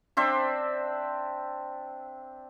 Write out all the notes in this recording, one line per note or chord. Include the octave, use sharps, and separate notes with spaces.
C4 D4 C5 E5